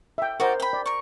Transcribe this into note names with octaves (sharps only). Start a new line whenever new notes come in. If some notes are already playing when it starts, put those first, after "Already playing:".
E5 G5
F#4 A#4 C5 D5 D#5 A#5
G5 B5
D5
A#4 C#6